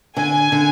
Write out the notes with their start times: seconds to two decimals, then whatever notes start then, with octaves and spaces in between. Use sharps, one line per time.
0.16 D3 G#5
0.52 D3